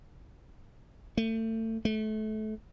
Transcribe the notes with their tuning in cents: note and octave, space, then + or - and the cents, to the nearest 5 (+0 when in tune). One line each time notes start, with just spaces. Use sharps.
A3 +30
A3 -25